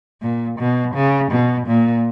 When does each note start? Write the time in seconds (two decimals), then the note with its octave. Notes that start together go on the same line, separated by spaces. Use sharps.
0.22 A#2
0.59 B2
0.95 C#3
1.32 B2
1.67 A#2